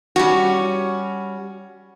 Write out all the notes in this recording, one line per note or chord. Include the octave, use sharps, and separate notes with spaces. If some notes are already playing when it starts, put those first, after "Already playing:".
G3 C#4 F#4